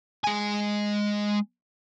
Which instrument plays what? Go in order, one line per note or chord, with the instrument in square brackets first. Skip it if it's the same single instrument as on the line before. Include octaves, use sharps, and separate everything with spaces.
[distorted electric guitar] G#3 G#5